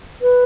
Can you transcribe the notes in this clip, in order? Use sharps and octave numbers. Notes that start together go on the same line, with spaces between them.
B4